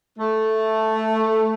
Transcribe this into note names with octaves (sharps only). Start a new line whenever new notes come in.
A3